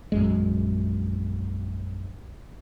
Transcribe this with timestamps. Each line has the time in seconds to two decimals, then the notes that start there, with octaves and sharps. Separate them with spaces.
0.12 A#1 F#2 G#3